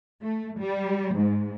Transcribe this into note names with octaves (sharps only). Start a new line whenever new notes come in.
A3
G3
G#2